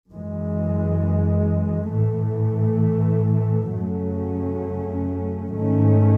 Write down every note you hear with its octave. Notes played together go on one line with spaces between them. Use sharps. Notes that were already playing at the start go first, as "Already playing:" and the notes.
F#2 E3 G#3
A2 E3 A3
F#2 C#3 F#3 A3 C#4
G#2 D#3 A3 C#4